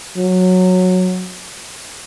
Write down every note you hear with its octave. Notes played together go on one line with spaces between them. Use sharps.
F#3